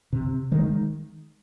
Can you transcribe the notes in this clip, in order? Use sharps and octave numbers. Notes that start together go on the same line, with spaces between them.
C3
D#3 G#3